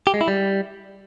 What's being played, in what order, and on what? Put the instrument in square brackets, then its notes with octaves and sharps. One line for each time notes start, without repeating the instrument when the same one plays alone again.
[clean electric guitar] G4
G#3
E4
G3